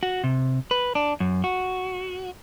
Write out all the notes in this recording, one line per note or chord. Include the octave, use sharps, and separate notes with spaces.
F#4
C3
B4
D4
F#2
F#4